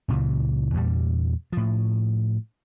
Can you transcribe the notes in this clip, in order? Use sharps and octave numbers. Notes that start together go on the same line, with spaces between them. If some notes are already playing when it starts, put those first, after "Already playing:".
C#2 A#2 C#3 E3
E2 A#2 G3
A2 F3